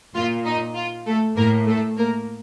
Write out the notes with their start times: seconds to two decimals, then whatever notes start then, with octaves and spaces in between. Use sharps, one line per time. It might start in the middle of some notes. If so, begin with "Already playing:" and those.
0.15 A#2 F4
0.45 D#4
0.76 F4
1.06 A3 A4
1.36 A2 A#3 A#4
1.67 A3 A4
1.98 A#3 A#4